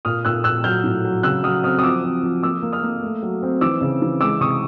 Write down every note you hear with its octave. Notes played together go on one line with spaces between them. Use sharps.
A#2 D#6 F6
A#2 E6 F#6
A#2 E6 F#6
F#3 F6 G6
A2
F#3
C#3 E6 F#6
F#3 D#6 F6
C4 D#6 F6
D#6
F3 D6 E6
C4
F3
A#3 D6 E6
A#3
D#6 F6
A#3
A3
F#3
C4
E3 D6 E6
C#3
E3
G#3 D6 E6
C3 C#6 D#6